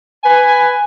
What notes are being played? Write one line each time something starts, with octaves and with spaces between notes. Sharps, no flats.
B4 G#5